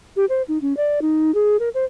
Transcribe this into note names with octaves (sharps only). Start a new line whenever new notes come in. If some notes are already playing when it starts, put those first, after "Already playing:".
G4
C5
D#4
C#4
D5
D#4
G#4
A#4
C5